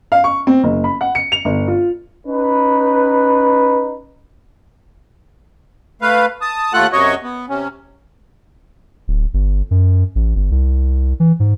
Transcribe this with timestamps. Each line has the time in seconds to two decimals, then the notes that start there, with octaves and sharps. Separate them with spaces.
0.12 F5
0.24 C#6
0.47 C4
0.63 F#1
0.84 B5
1.01 F#5
1.15 C#7
1.32 F7
1.45 G1
1.68 F4
2.26 C#4 D#4 B4
6.02 A3 B4 F5
6.41 A5 D#6
6.73 D#2 A3 F4 A4 F#5 F#6
6.93 F#2 C3 F#4 C#5 D#5 C#6
7.23 B3
7.49 C3 C#4
9.08 D1
9.34 G1
9.71 F#2
10.15 A1
10.35 G1
10.51 C2
11.20 E3
11.40 G#2